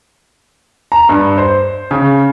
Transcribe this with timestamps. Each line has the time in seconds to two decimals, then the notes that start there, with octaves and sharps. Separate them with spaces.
0.92 A#5
1.09 G2
1.38 C5
1.91 C#3